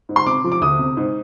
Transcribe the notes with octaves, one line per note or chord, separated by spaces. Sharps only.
G#2
C6
C3 D6
F3
D6
D2 D#6
C3
G#2